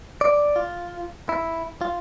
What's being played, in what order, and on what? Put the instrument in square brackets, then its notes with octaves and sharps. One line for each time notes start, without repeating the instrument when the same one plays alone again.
[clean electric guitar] D5
F4
E4
F4